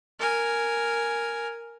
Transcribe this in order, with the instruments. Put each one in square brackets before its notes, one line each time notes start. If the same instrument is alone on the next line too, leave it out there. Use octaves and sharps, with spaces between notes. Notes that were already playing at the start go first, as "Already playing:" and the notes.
[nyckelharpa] A#4 G#5